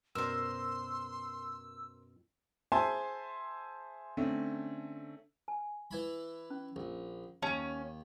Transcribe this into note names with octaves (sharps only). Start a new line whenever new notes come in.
F#2 B2 A#4 C5 D5 C6 E6
G#4 C5 E5 G#5 A5 C6
D3 A3 C4 C#4
G#5
E3 E4 B5
C#4
A#1
D#2 C#4 A5